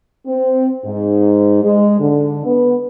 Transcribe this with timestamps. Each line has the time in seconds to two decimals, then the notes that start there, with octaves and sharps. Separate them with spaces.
0.27 C4
0.85 G#2
1.64 G#3
2.00 D3
2.46 B3